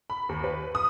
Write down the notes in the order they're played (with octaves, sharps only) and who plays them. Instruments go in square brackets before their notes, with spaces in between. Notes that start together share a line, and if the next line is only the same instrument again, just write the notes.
[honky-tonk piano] B5
D#2
B4
D#6